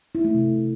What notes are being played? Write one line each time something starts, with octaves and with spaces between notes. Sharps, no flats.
E4
A3
C3